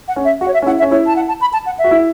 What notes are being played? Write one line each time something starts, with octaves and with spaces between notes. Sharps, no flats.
F#5
C#4
E5
F#4 F#5
C#5
E5
C#4
E4 F#5
E5
C#4
E4 C#5
A5
F#5
A5
B5
A5
F#5
E5
F#4
E4